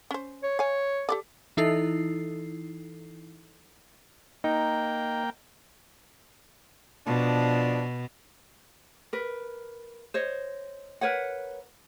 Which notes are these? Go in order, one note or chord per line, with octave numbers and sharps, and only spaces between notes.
C#4 C5
C#5
C#5 F5 G#5
G4 A4 D5
E3 D#4 E4 A4 C7
A#3 D#4 G5
B2 F3 D4
A#4 B4
C5 C#5 D#5
A#4 B4 C#5 F#5